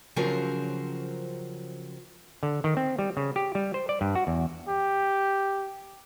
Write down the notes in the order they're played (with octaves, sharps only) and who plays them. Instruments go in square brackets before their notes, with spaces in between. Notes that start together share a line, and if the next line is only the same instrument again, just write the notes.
[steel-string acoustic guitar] C#3 F3 F#3 C4 A#4 C5
[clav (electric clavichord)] D3
D#3
C4
G3
C#3
G4
G3
C5
D5
G2
F#4
E2
[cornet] G4